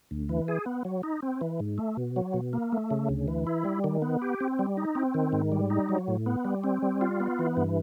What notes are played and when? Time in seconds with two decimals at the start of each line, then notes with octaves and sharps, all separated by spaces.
0.11 D2
0.29 E3
0.48 G#4
0.66 B3
0.85 F#3
1.03 D#4
1.22 C4
1.41 E3
1.60 G#2
1.78 A3
1.97 B2
2.16 F#3
2.34 B2
2.53 A#3
2.72 A3
2.91 C#3
3.09 D2
3.28 E3
3.47 E4
3.65 G3
3.84 D#3
4.02 B3
4.22 G4
4.40 C4
4.59 G3
4.77 D#4
4.95 C4
5.14 D#3
5.33 G#2
5.52 G3
5.70 D#4
5.89 F#3
6.08 A2
6.26 B3
6.45 G3
6.64 C4
6.82 G3
7.01 F4
7.20 B3
7.39 E3
7.57 G2